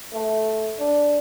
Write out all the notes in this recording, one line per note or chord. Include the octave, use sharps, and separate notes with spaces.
A3
D4